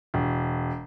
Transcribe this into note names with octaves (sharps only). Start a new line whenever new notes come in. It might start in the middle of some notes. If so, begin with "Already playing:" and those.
E1